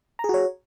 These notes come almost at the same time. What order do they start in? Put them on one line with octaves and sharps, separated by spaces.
A#5 G#4 F#4 C#5